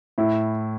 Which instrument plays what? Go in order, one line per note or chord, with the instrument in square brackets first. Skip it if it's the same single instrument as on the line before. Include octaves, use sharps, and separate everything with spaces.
[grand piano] A2 [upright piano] E4